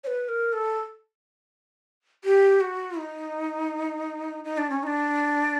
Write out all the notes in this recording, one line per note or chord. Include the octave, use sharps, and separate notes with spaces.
C#5
B4
A#4
A4
G4
F#4
D#4
D#4
D4
C#4
D#4
D4